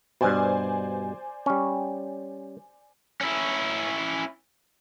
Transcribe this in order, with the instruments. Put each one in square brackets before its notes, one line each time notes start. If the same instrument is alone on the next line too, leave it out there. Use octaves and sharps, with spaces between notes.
[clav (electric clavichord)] G2 B2 [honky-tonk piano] C5 D5 G#5
[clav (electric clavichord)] G3 C#4
[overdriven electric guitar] C#4 E4